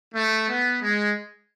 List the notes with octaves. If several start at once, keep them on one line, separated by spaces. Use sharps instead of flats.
A3
B3
G#3